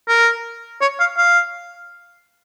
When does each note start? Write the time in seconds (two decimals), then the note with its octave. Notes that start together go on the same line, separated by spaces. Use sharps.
0.08 A#4
0.81 C#5
1.00 F5
1.18 F5